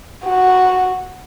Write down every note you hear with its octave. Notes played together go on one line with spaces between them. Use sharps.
F#4